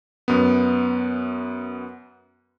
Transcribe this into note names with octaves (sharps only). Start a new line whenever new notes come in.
F#2 B3